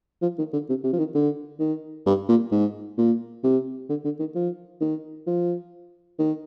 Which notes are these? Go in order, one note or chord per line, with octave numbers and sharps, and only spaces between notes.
F3
D#3
D3
C3
C3
F3
D#3
D3
D#3
G2
A#2
G#2
A#2
C3
D3
D3
D#3
F3
D#3
F3
D#3